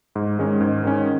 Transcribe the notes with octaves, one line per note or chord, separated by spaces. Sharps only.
G#2
D#3 G#3 C#4
G#2
D#3 G#3 C#4